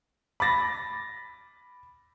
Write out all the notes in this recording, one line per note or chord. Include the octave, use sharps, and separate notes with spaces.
B5 D6 A6 A#6